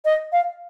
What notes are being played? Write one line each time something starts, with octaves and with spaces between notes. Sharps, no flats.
D#5
F5